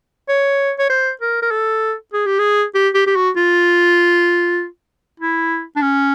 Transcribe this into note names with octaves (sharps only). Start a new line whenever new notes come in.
C#5
C#5
C5
A#4
A#4
A4
G#4
G4
G#4
G4
G4
G4
F#4
F4
E4
D4
C#4